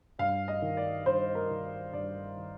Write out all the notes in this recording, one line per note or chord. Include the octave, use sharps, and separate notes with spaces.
G2 F5
D#5
D#3
D5
G2 C5
A#4
D#3
G2 D5
D#3